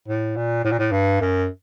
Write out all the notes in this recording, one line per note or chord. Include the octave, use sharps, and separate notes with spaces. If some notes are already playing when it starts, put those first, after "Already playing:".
A2
A#2
A2
A#2
A2
G2
F#2